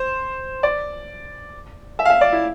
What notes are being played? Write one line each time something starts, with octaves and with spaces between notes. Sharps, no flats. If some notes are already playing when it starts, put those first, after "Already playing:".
Already playing: C5
D5
E5
F5
E5
D5
E4